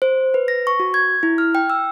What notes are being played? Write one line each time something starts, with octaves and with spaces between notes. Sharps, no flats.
C5
B4
A#6
C#6
F#4
G#6
E4
F6
G5
E6